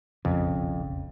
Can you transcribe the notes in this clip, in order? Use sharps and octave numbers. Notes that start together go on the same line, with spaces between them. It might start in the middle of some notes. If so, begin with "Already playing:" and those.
E1 A#1 F2 C#3